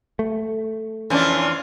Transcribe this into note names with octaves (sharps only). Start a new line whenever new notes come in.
A3
F2 E3 C#4 D4 F4